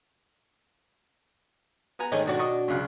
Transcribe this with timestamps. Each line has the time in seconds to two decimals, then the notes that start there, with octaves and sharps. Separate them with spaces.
1.99 B3 G#5 A#5
2.12 G#2 D#3 A3 G#4 C#5 D#5
2.26 B2 D4 F#4
2.39 D#5 C#6 D#6
2.68 C#2 F#2